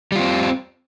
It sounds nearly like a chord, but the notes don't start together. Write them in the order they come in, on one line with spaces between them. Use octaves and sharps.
G3 F4 C4